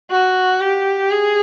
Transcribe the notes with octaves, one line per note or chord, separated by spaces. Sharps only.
F#4
G4
G#4